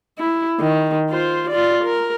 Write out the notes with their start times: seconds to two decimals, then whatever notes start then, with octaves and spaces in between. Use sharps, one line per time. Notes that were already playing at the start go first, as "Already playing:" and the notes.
0.19 E4
0.60 D#3
1.10 F4 C5
1.51 F4 D5
1.84 A#4